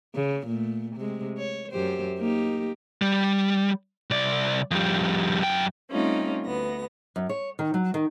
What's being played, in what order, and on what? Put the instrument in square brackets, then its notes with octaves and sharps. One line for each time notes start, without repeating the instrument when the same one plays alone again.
[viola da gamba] C#3
A#2 A3
C3 G#3
C#5
F#2 G4 C5
A#3 D#4 G4
[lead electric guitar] G3
C2 D5
F2 G3
F#2 G5
[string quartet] G3 A3 C4 C#4 D#4 F4
D2 B3 A#6
[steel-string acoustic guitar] F#2
C#5
D#3
F#3
D#3